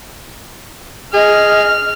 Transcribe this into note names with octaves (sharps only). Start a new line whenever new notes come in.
G#4 D#5 F6